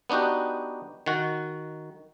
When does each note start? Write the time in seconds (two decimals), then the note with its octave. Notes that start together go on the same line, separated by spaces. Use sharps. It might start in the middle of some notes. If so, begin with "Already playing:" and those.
0.10 B3 D4 D#4 F#4 G4
1.06 D#3 F#4